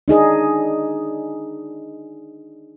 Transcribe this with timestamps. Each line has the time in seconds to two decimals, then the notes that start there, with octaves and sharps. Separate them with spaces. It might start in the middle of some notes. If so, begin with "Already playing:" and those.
0.08 D4 D#4 G#4 D#5